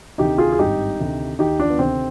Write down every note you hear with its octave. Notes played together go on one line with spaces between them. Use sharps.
D2 C3 D#3 D#4 G4
F4 G#4
G#4
G#1 G2 D#3 D#4 G4
D2 C3 D#3
D#2 D#3 D#4 G4
D4 F4
B3
D2 C3 D#3 C4